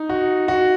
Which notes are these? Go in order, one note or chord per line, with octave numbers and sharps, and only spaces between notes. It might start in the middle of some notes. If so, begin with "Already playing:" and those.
Already playing: D#4
F#4
F#4